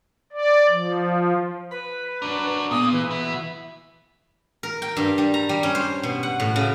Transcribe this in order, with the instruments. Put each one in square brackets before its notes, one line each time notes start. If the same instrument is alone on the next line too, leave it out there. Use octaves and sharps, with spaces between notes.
[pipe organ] D5
F3
[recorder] B4 [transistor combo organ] B5
[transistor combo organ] D4 [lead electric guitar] F#4 A#4
[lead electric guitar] A#2 [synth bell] B3 [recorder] D#6
[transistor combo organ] E3 [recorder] B4
[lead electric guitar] F#4 B4 [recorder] E5
[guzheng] A#4
G5
G2
G3
A#5
G3
C#4
C5
B2
F#5
A2
C#3